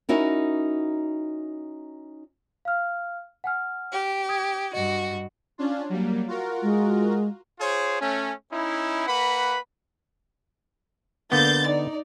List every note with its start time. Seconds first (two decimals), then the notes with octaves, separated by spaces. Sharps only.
0.09 C#4 D#4 E4 F#4 A#4
2.65 F5 F6
3.44 F#5 G#5 F6
3.92 G4
4.29 D#6 G#6
4.73 G2 F#4 D#5
5.58 C#4 D4 F4
5.90 F#3 G3 A#3
6.28 F4 F#4 A#4
6.62 G#3
7.59 F4 G#4 C5 C#5
8.00 A3 C#4
8.51 C#4 D#4 E4
9.06 A#3 B4 F#5 B5
11.32 D3 A#3 B3 G6 A6
11.66 D#4 D5